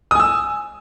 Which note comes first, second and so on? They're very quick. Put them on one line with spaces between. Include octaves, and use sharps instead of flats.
D#6 G#5 E6